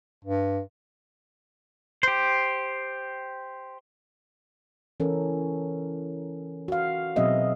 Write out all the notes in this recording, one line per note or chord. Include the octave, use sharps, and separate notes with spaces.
G2
G4 C5
E3 C#4 A4 A#4
F#4 F5
B2 F#3 C4 G#4 D#5 E5